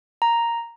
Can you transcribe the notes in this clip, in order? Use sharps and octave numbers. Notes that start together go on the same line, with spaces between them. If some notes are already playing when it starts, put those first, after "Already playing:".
A#5